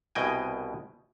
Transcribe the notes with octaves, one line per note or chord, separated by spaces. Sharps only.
C2 B2 D#5 G5 G#5